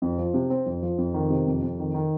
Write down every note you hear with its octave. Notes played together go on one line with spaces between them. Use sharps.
F2
F3
C3
C4
F2
F3
F2
D#3
C3
F2
F2
D#3
D#3